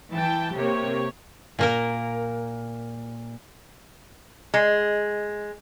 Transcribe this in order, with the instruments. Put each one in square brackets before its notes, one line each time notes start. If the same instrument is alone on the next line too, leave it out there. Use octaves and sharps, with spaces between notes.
[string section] E3 [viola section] G5 A5
[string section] C3 A#3 [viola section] G4 C#5
[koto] A#2 A#3 A#4
[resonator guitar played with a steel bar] G#3